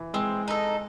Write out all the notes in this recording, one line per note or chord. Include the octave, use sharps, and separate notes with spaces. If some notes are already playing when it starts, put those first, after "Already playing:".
Already playing: E3
G#3 C4
D#4 A4